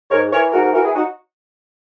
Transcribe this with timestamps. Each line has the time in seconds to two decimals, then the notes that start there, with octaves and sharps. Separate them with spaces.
0.10 G#2 A#4 C#5
0.31 E3 A#4 C#5
0.52 G#2 F#4 A#4
0.63 F#4 A#4
0.73 E3 F#4 A#4
0.84 E4 G#4
0.94 D#4 F#4